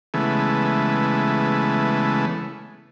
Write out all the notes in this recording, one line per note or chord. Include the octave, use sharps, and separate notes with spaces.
C#3 E3 G#3 A3 B3